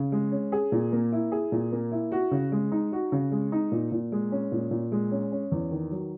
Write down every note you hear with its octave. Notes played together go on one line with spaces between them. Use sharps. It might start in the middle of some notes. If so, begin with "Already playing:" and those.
Already playing: C#3
G#3
C#4
G#4
A#2
A#3
E4
G#4
A#2
A#3
E4
F#4
C#3
G#3
D#4
F#4
C#3
G#3
D#4
A#2
A#2
G#3
C#4
A#2
A#2
G#3
C#4
C#4
E2
D#3
F#3